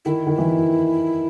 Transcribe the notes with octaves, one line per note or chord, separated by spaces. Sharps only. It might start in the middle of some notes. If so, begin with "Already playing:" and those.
D#3 E4
D#3
E3